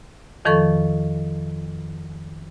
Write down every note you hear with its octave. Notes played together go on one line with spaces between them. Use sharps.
F2 D#3 F3 A4 C#6